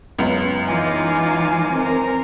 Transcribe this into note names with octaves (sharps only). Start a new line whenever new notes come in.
C#2 F#2 B3
E3 D#4 F4 G#5 D6
C4 A#4